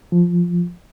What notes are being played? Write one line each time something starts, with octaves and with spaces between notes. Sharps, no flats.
F3